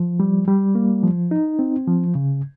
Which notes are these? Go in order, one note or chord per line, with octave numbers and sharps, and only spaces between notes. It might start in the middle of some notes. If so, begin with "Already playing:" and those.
Already playing: F3
G3
G3
A#3
F3
D#4
C4
F3
C#3